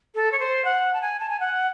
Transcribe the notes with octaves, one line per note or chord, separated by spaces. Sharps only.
A4
C#5
C5
F#5
A5
G#5
A5
G#5
F#5